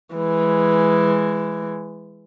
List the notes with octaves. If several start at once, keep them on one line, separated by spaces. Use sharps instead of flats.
E3 G#3